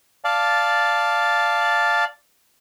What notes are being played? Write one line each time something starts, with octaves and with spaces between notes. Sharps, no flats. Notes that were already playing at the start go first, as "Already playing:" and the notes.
D5 F5 A5